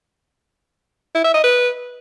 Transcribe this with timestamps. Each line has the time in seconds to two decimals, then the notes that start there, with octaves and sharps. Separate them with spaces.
1.14 E4
1.24 E5
1.34 D#5
1.44 B4